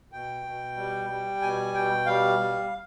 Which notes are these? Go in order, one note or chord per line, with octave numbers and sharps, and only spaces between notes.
B2 G5
B2
G3
G3
B2 G#5
B2 G5
G3 F5
G3